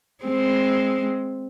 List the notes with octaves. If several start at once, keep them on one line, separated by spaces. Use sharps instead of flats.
G#3 C4